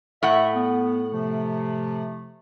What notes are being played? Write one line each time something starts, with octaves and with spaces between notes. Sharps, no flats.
A2 E5 F#5
B3
C3 F3 A3